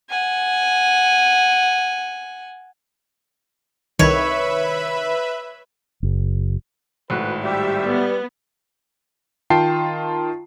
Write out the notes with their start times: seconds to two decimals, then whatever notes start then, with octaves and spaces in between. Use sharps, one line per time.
0.10 F#5 G#5
3.99 C2 D#3 B4 C#5 E5 B5
6.03 F#1
7.10 G#1 A2 F#4 B4
7.43 G3 G4 E5
7.86 B3
9.50 D#3 F4 G5 A5 C7